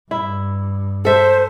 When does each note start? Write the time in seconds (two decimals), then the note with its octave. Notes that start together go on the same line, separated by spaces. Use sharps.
0.11 G2 E4
1.05 A4 C5 E5